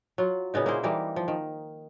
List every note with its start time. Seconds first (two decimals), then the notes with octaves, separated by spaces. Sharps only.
0.18 F#3 F4
0.54 A#2 C#3 B3 D#4
0.66 A#3 E4 G#4 C5
0.83 E3 G3 A#3 D#4
1.16 F3
1.28 D#3